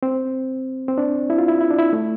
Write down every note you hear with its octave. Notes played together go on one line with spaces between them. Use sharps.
C4
C4
D4
E4
F4
E4
E4
D4
E4
A3